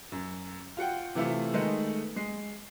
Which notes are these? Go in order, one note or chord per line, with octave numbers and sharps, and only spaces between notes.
F#2
F4 F#4 F#5 G5
C3 E3 A3 E4 F4
D#3 G#3 A3 B3 D#4
G#3 C7